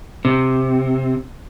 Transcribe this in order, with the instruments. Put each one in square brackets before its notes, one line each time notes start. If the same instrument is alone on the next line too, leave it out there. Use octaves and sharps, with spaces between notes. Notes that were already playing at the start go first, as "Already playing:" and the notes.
[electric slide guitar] C3